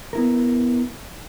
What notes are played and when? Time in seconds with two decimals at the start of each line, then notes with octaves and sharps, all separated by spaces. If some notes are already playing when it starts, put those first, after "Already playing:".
0.13 B3 E4 A#4